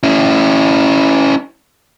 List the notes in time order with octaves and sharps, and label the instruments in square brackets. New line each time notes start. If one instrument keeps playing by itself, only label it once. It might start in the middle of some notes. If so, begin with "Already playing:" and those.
[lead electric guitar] C#4 E4